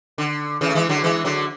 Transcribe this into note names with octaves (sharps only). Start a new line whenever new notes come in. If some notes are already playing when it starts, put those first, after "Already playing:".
D3
C#3 E3
A3
E3 G#3
D3 F#3
E3 G#3
D3 F#3